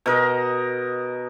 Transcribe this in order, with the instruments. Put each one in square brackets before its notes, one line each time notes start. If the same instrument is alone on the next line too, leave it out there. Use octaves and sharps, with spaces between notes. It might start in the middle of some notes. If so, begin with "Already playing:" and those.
[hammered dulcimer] B2 A#4 D#5